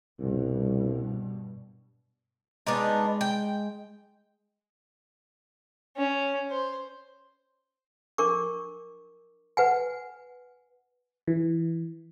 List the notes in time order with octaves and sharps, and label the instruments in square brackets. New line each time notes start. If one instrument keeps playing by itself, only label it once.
[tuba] C2 [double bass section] G2 B2
[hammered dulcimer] G#3 [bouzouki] B3 D4 D#4
[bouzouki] G5
[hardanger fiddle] C#4
C5
[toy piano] D4 A#4 C#6 D6
B4 F#5 G#5
[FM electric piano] E3